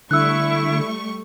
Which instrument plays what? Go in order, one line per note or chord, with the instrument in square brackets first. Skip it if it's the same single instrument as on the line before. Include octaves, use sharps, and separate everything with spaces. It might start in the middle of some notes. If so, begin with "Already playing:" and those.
[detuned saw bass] D3 [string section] G3 A3 C#6 [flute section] E4 [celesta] E6 F#6